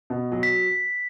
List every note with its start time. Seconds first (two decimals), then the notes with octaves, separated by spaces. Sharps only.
0.10 B2
0.32 F#3
0.43 B6